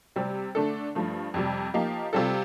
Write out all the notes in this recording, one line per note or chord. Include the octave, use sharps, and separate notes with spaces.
C3 G3 C4
D3 A3 D4 A4
G2 F3 A3
F2 C3 G3
F3 A#3 D#4 G4
C3 G3 C4 F4 A4